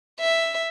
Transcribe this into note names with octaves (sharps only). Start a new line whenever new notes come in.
E5